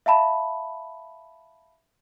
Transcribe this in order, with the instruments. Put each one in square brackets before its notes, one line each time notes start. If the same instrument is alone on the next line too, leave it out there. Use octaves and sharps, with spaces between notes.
[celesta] E5 F5 A5 B5